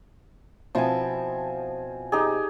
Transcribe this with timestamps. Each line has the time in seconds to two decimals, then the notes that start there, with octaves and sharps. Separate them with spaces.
0.75 B2 F3 C4 E4 G#5
2.12 D#4 G4 G#4